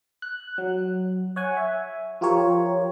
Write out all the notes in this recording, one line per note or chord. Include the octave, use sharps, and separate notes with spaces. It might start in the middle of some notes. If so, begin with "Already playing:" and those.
F#6
F#3
C#5 F#5 G#5
E5
F3 F4 G4 A#4 C#5